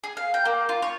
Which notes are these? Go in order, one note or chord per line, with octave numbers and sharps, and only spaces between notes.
G#4
F5
G5
A#3
F4
C#5